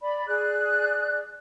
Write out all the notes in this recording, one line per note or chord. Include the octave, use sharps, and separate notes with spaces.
D5 B5
G#4 D5 F#6